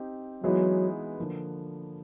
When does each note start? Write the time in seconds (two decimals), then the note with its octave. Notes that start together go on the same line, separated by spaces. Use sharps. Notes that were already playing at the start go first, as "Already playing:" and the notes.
Already playing: C4 D#4 G4
0.43 E3 F#3 G#3 B3 D#4 F#4
1.18 D3 F3 A#3